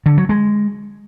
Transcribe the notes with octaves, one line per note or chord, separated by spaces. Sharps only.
D3
F#3
G#3